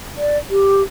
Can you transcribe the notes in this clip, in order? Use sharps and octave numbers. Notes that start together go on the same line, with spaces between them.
D5
G4